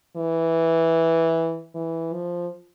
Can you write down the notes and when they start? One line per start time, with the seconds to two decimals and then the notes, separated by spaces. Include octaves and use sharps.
0.16 E3
1.75 E3
2.13 F3